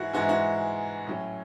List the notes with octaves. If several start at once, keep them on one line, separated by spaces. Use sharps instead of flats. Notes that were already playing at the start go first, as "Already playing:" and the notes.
Already playing: G#2 E3 G#3 E4 F#4
G#2 E3 G#3 F#4
E4
F#4
A2 F#3 C#4